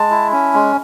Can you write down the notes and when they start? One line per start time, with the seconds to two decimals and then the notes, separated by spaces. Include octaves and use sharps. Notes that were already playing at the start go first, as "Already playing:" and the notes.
Already playing: G#3 A5
0.11 E4
0.32 C#4
0.54 G#3